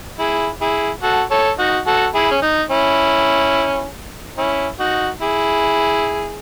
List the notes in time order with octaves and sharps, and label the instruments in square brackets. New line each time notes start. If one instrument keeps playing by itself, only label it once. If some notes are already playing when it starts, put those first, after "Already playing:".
[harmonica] E4 G#4
E4 G#4
F#4 A4
A4 C#5
D#4 F#4
F#4 A4
E4 G#4
C#4
D#4
C#4 E4
C#4 E4
D#4 F#4
E4 G#4